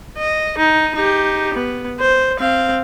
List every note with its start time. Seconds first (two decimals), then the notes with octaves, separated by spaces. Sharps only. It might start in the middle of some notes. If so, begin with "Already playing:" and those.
0.18 D#5
0.58 D#4
0.96 D#4 G4
1.55 B3
2.00 C5
2.40 C4 F5